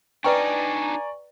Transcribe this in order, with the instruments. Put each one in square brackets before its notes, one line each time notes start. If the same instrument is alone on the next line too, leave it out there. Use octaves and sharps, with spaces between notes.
[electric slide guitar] D4 D#4 [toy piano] B4 G5 [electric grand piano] D5 A#5 C#6 [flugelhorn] G#5